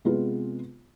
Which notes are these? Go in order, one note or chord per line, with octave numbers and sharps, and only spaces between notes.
C3 G#3 B3 F4 B4